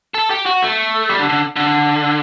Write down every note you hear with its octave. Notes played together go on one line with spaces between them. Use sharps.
A4
G4
F#4
A3
G3
D3
D3
D3